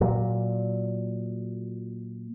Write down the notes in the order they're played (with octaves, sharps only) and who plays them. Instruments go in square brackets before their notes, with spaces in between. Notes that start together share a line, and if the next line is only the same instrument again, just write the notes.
[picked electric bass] A#2 F#3